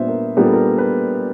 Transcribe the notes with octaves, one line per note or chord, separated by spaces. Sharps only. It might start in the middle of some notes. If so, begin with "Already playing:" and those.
Already playing: A#2 G3 B3 D4 C5 E5
A#4
A#2 G3 B3 D4 A#4
A4
A#4
B4